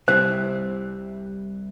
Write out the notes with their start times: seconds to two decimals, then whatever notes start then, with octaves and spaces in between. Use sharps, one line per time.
0.08 C2 C3 G3 E4 C5